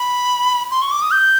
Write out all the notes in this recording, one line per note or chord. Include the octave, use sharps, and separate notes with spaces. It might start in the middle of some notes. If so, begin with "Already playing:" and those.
Already playing: B5
C6
C#6
D6
D#6
G6